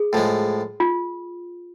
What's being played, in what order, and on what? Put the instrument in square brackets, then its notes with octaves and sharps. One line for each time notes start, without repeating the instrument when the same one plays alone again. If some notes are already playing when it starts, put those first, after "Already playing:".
Already playing: [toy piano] G#4
[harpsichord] A2 F3 G#3
[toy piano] F4